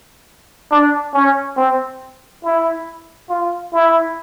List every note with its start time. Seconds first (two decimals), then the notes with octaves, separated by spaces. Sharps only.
0.71 D4
1.14 C#4
1.57 C4
2.44 E4
3.30 F4
3.73 E4